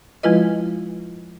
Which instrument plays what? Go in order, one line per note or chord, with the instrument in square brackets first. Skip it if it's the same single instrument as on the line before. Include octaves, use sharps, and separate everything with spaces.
[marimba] F3 G#3 E4 F4 B4 D#5